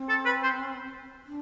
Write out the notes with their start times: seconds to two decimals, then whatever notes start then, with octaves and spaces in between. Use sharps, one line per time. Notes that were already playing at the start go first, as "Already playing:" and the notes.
Already playing: C4
0.09 A4
0.25 B4
0.43 C5
1.26 D4